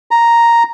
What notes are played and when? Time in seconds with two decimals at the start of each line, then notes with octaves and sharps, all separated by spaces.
0.11 A#5